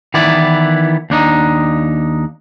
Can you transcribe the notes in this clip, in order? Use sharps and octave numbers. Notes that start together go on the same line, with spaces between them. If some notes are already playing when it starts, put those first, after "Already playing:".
D#3 E3 B3 E4 D5
D#2 D4 D#4